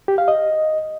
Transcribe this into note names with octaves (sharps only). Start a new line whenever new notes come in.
G4
F5
D#5